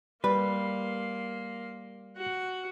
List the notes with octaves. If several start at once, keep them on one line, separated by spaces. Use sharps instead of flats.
G3 A#3 B4 C6
F#4 F#5